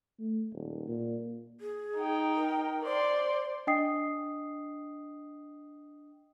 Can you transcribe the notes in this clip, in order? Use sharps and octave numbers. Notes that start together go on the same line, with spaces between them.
A3
D#1
A#2
G#4
D#4 G5
A#4
C5 D5 C6
D4 D#5 G5 D#6 C7